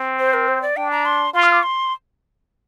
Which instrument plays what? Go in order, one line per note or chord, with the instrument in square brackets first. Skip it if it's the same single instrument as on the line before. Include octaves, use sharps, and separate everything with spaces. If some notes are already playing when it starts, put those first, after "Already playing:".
Already playing: [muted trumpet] C4
[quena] C5
A#4
C5
D5
[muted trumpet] D4 [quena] G5
[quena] A#5
C6
[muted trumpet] F4 [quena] C6
[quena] F6
D6
C6